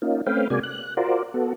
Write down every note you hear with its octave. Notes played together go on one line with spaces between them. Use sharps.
A#3 C#4 D#4 F4
A3 C4 C#4 B4 F5 G5
C3 G#3 A#3 F#4 D5 G#5
F#6
F4 F#4 A#4 C5 D5
B3 F#4 A4